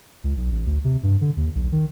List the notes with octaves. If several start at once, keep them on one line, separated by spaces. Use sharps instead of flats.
C#2
B1
A1
D2
C3
G2
D3
D#2
B1
D#3